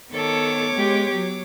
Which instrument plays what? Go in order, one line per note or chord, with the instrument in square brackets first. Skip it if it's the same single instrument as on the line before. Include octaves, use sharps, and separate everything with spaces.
[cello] D#3 A4 [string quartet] B3 C#5 D6
[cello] G#3 G4
F#3